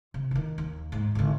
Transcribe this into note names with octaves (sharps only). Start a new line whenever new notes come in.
C3
D#3 F3
D#2
G#2
G#1 D3